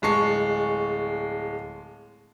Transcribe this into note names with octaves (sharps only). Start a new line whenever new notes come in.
D1 G#3 A5 C#6 C7